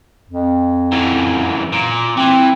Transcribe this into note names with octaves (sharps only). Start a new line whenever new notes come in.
F2
F#2 E3
A#2
E3 C4